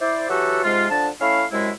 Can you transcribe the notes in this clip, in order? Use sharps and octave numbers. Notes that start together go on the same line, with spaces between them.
E4 C5 D5
E3 F#3 F#4 G4 A4 F#5
G#2 C3 G#3 F4
D3 F3 D4 A5
A3 C#4 E4 F5
F#2 C3 G#3 E4